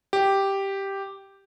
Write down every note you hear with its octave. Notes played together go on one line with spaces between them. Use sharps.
G4